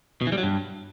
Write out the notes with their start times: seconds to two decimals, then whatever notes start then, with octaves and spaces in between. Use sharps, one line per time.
0.21 B2
0.27 E3
0.32 G3
0.38 F#3
0.43 G2